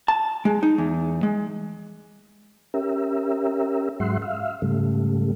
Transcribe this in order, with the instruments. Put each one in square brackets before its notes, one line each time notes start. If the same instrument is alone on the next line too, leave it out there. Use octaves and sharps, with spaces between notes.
[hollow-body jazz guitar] A5
G#3
D#4
E2
G#3
[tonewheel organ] C#4 G4 A#4 E5
G#2 F#3 G#3 E5 F#5 C6
E5 F5
G#2 C#3 G3 A3